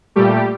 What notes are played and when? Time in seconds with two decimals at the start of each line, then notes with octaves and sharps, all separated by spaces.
0.16 A#2 G3 A3 G4